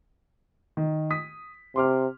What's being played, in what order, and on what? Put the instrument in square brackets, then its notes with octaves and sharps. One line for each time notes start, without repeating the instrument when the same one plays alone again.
[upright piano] D#3
D#6 B6
[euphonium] C3 [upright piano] C6 D6 F6